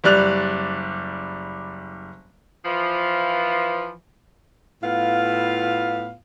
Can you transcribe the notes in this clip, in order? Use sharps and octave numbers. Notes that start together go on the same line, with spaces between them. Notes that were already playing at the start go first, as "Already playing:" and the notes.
F#1 G3 D5 F#6 F7
E3 F3
A2 B3 F4 F5